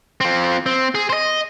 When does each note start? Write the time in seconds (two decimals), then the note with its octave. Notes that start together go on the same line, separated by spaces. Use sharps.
0.21 F3 C4
0.66 C4
0.95 G#4
1.10 C5 D#5